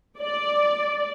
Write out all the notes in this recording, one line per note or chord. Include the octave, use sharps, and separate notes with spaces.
D5